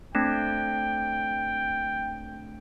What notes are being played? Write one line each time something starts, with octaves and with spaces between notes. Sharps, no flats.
A3 C4 D4 G5